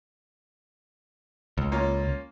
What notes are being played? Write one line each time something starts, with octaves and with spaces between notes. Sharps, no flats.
C#2
A#3 C#4 F4